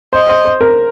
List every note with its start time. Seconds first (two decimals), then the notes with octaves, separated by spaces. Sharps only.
0.13 C5 D#5
0.29 C5
0.45 C5
0.61 A#4